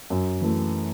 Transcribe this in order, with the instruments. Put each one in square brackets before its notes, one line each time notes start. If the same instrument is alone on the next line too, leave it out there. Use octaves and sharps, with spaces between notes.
[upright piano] F#2
E3 A3